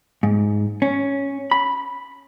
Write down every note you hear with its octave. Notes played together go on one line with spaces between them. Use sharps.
G#2
C#4
B5